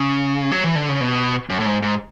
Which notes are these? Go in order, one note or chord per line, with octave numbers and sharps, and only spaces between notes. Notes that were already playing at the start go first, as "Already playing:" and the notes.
Already playing: C#3
F#3
E3
D3
C#3
B2
F#2
A2
G#2
G#2